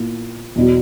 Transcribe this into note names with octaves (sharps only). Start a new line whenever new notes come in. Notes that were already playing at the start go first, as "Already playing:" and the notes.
Already playing: A#2 A#3 E4
E2 B2 F#3